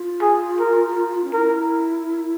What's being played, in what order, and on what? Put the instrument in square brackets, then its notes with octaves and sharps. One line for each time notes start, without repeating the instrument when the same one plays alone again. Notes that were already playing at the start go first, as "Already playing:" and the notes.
Already playing: [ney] F4
[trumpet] G#4
A#4
[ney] C#4
[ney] E4 [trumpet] A#4